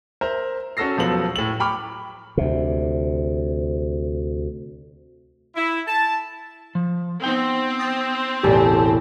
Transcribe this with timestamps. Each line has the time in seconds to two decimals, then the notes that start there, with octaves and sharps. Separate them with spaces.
0.21 A#4 C5 E5
0.77 C#4 F#4 A4 E6 A#6 C7
0.97 E1 F3 F#3 B3 A4 F#7
1.36 A2 F#7
1.60 G5 A#5 B5 C#6 D6 F6
2.37 D2 C3
5.55 E4
5.87 A5
6.75 F3
7.24 B3 C4 D#4 G5
7.79 D#6 A6 A#6
8.43 E1 A1 G4 A4